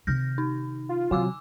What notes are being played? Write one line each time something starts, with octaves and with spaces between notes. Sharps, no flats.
C3 D#3 F6 G6 A#6
D#4
F4
C3 D#3 F#3 G#5 D6 E6